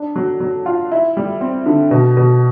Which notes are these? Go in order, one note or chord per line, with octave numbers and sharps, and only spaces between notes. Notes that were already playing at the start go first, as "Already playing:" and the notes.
Already playing: D4
F#3
F#3
F4
E4
G3
C4
D3
B2
B2